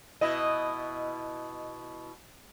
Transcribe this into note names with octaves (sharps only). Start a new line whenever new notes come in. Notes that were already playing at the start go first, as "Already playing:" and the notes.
B2 E4 D#5